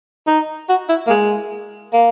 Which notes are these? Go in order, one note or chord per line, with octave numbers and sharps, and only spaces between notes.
D#4
F#4
E4
A#3
G#3
A#3